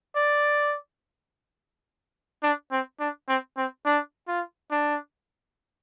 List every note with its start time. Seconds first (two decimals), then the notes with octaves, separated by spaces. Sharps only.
0.16 D5
2.43 D4
2.72 C4
3.00 D4
3.28 C4
3.57 C4
3.85 D4
4.28 F4
4.71 D4